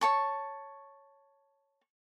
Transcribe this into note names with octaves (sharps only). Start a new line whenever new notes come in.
C#5 A5 C#6